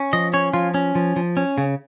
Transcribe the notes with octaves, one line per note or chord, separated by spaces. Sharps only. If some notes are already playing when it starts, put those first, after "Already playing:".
Already playing: C#4
F3 D#5
C#4 C#5
F3 F4
C#4
F3
F3
C#4
C#3